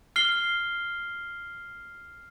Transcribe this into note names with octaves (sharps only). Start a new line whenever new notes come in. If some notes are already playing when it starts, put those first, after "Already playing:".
F6 C7 G7